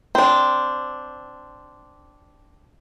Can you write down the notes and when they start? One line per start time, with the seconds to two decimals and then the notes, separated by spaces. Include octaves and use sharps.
0.15 C4 D4